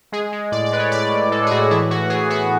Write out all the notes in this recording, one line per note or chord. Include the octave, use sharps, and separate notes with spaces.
G#3 G#4
G#3
A2 D5
D5
G#3 B4
C#5
A2 D5
A2
G#3 A4
G#4
A2 F#4
E3 E4
E3 F#4
E3 G#4
B3 F#4